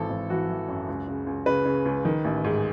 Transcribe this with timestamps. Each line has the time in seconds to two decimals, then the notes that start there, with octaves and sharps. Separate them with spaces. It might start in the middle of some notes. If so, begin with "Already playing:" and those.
Already playing: G#1 E3 A4
0.10 G#1
0.30 E3 F#4
0.49 E3
0.68 F#2
0.88 C#2
1.08 C#3
1.27 C#2
1.46 C#3 B4
1.65 C#3
1.85 C#2
2.05 D#3
2.25 A1
2.44 G#2